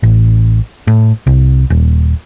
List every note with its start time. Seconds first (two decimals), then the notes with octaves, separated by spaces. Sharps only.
0.03 A1
0.87 A2
1.27 C2
1.70 D#1